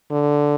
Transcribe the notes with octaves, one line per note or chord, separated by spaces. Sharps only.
D3